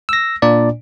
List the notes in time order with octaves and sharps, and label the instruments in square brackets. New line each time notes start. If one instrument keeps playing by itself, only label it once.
[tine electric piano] E6 A#6
A#2 D4 D5